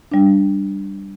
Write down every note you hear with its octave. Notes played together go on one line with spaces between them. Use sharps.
G3 D4